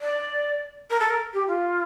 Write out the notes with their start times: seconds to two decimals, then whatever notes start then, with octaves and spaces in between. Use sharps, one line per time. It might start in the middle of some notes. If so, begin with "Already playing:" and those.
0.01 D5
0.90 A#4
1.00 A4
1.10 A#4
1.33 G4
1.48 F4